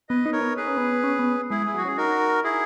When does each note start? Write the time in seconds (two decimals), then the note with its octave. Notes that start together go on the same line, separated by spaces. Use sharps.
0.09 B3 B4 D#5
0.26 D#4
0.32 A#4 C#5
0.41 B3
0.56 B3 G#4 B4
0.67 C#4
0.77 B3
1.04 C#4
1.19 B3
1.50 G#3 E4 G#4
1.62 G#3 E4
1.74 F#3 F#4
1.85 C#4 G#4
1.97 D#4 F#4 A#4
2.44 E4 G#4